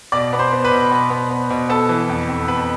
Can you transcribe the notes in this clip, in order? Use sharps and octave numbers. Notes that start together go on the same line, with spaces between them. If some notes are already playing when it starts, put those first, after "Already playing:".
B2 D5 D6
B3
C5 C6
B3
B4 B5
B2
B2
B3
B3
B2
B3 A4 A5
E3
F2
F2
B3 B4 B5